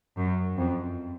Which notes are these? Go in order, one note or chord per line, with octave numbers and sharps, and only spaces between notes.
F#2
F2